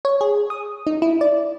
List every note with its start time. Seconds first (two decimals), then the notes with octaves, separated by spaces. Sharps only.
0.05 C#5
0.21 G#4
0.50 D#6
0.87 D#4
1.02 E4
1.21 D5